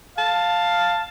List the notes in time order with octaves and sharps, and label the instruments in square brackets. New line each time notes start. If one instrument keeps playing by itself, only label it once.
[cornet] F5 [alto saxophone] A5